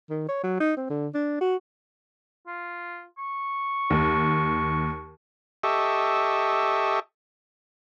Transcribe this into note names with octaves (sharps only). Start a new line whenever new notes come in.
D#3
C#5
F#3
D#4
C4
D3
D4
F#4
F4
C#6
D#2
G4 A4 D#5 E5 C#6